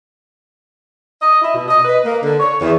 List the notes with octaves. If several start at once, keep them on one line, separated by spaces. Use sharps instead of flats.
D#5
E4
B2
D#5
B4
A#3
D3
C#5
E2